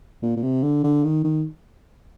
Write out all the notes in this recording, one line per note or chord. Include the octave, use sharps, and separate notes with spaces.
A#2
A#2
C3
D3
D3
D#3
D#3